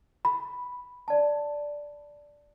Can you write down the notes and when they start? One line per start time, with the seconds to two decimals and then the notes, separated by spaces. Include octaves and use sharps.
0.25 B5
1.08 D5 A5